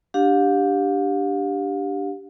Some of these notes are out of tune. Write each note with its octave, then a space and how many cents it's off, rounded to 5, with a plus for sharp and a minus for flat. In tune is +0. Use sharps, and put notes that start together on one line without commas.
D4 -5 G4 +0 F5 +40